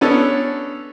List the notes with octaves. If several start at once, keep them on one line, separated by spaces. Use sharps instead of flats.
B3 C#4 D4 A4